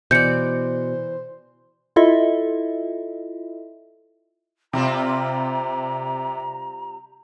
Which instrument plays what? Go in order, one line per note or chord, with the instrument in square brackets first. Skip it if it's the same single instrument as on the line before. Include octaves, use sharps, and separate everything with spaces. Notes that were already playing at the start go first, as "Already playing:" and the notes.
[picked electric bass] B2 [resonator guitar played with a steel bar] E3 D5 [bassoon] C5 [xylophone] G6 C#7
[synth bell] E4 F4 A4 D#5 E5
[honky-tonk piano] C3 [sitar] G3 C4 F4 [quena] A#5